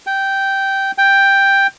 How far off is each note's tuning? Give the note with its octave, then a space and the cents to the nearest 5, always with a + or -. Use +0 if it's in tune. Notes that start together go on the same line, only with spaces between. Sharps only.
G5 -10
G5 +5